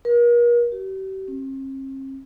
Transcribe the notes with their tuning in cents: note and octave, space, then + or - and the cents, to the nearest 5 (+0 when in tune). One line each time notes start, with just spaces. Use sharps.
A#4 +40
G4 -40
C4 +45